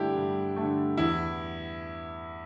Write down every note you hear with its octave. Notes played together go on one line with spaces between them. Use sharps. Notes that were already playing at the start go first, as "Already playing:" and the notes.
Already playing: G2 D3 A3 D4 E4 G4
G2
D3 A3
E2 E4